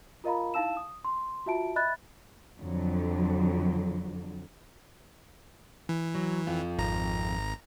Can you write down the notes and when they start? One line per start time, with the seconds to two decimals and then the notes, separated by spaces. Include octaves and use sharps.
0.24 F4 A#4 D#5 F5 A#5 B5
0.54 D#4 E4 F5 A5 E6 E7
0.77 D#6
1.05 C6
1.46 F4 F#4 E5 A5 D7
1.76 D#5 E5 B5 F#6 A6
2.60 F2 D3 F#3
5.89 E3
6.15 F#3
6.47 F2 F4
6.78 G#1 A#5